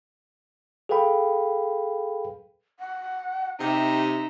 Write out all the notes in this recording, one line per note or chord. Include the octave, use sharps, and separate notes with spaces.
G#4 A4 B4 F5 G5 B5
F#5
C3 D#4 G4 E5